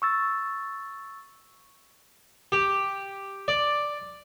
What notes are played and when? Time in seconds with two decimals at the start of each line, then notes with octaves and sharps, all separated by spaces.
0.02 C#6 E6 A6
2.52 G4
3.48 D5